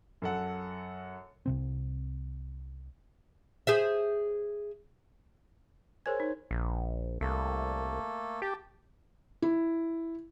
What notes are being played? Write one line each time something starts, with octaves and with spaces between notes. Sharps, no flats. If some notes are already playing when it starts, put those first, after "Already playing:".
F#2 A4 F#5
C2 C3 C4
G#4 C5 E5
G#4 A#4 C5 C#5 G#5 G#6
D#4
A#1
C2 A3 A#3 A4
G4 G5 A5
E4